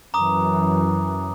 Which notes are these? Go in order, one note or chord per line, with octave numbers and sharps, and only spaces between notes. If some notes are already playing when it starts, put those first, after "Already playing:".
F#2 E3 A#5 D6 D#6